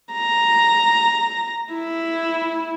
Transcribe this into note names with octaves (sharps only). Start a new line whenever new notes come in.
A#5
E4